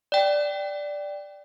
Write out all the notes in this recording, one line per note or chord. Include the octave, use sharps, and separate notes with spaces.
D5 G5